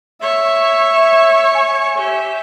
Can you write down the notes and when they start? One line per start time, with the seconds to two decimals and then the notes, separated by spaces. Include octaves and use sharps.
0.22 C#5 E5 C#6
1.55 G#5
1.97 G4 E5